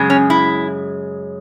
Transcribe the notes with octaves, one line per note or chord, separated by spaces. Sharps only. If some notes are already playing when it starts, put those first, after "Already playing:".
Already playing: F#2 C#3 G#3
C#4
E4